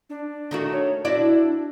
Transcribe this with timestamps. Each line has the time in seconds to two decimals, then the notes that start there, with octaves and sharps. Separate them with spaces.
0.10 D4
0.51 D#3 A3 F#4
0.72 C#5
1.05 D4 E4 F#4 D5